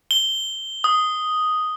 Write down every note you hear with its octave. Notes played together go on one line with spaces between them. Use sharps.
G7
D#6